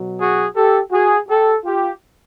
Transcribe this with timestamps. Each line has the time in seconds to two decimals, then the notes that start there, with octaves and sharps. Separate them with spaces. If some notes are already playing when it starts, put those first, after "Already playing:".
Already playing: B2 F#3
0.20 F#4 G#4
0.55 G4 A4
0.92 F#4 G#4
1.29 G4 A4
1.65 F4 G4